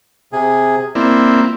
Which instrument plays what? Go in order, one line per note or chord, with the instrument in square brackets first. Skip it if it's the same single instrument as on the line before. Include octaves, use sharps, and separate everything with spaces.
[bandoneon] C3 G#4
[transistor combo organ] A#3 C4 E4 [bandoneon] D5